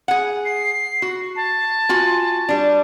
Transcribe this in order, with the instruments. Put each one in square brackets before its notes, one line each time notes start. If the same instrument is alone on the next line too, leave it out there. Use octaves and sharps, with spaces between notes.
[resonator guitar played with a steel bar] G#4 F#5
[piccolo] C7
[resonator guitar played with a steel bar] F#4
[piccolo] A5
[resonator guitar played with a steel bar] F4 F#4 G#5
G3 D4